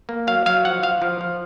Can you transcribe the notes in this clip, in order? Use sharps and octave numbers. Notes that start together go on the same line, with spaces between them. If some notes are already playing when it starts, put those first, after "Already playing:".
A#3
F#3 F5
F#3 F5
F3 F#5
F3 F5
F3
F3